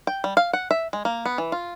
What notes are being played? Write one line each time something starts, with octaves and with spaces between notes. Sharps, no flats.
G5
G3
F5
F#5
E5
G#3
A#3
B3
E3
F4